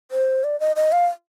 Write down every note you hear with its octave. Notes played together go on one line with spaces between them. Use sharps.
C5
D5
D#5
D#5
F5